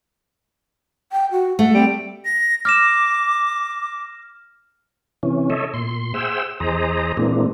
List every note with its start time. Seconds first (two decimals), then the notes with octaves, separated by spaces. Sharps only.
1.12 G5
1.32 F#4
1.59 A3 F#5
1.74 G3 C4
2.25 A#6
2.65 D6 F6 A#6 E7
5.23 C3 E3 C#4
5.50 A4 C#5 D#5 E5
5.74 A#2 C6
6.14 G#4 C5 E5 F#5 G5 E6
6.60 E2 G#4 C5 D#5 A#5
7.17 A#2 E3 G#3 A#3 C4 D4